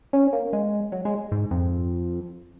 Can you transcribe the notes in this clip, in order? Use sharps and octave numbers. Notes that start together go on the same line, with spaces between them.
C#4
A#3
G#3
F#3
G#3
G#2
F2